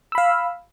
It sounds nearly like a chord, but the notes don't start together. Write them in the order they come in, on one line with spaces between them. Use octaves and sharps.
E6 B5 F5